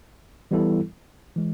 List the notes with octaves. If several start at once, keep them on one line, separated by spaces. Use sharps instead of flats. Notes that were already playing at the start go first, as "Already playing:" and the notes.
E3 G3 B3 E4 A4
E3 G#3